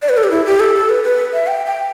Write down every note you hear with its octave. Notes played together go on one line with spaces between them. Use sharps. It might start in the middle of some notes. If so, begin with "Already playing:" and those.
D5
B4
A4
G4
E4
G4
A4
A4
B4
B4
E5
G5
G5